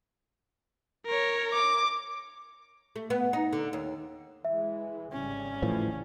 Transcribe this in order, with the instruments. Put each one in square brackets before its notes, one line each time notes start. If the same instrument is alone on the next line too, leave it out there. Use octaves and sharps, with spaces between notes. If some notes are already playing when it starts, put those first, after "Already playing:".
[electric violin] A#4 C#5
[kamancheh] D6
[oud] A3
B3
D#4
D3
D#2
[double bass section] E3 G#3 [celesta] E5
[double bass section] G#1 C#3 G3 [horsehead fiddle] C#4
[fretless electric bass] A2 E3 F3